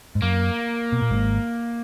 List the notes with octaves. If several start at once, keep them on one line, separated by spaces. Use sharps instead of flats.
G#2
F#2 A#3
B2
A#2
G#1 G#2